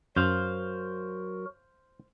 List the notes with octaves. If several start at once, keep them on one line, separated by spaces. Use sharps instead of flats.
F#2 F#3 F#4 A#4 C5 F5